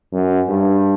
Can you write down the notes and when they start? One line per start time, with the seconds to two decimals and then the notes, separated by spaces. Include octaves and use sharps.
0.12 F#2
0.49 G2